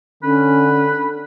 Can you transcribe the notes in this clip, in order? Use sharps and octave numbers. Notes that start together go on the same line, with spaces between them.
D3 C#4 B4